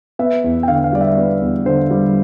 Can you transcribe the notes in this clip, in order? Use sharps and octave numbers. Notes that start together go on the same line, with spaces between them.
B3 E5
E2
G5
D3 F5
F5
G3 D5
E5
B3 D5
E2
D3 C5
G3